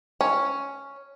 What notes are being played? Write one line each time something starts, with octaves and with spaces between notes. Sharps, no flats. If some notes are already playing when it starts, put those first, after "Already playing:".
C#4